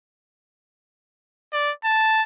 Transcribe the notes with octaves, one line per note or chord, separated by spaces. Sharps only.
D5
A5